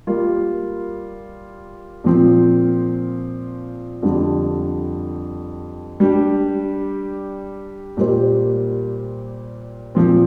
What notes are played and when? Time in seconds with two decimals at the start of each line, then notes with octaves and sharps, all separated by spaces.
0.07 G3 A#3 F4
2.04 A#2 F3 C4
4.03 F2 D3 G3
6.00 G3 D4 G4
7.97 A#2 G3 A#3 G4 C5
9.95 A#2 F3 C4